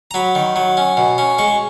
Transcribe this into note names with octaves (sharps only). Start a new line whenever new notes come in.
A#5
F#3 B5
D#3
F#3
C#4
B2
C#4
G#3 C#6